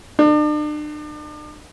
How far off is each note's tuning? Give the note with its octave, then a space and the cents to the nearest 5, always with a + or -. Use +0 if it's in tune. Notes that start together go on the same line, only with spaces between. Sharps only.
D4 +40